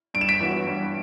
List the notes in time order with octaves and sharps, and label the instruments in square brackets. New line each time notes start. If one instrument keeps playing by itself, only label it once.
[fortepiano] G2 [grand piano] D7
[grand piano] E7
B6 D7
[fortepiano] E3 B3 F#4
G2